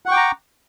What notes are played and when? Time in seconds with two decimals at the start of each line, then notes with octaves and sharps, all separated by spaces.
0.06 F#5
0.08 C#6
0.11 G5
0.14 D6
0.17 A#5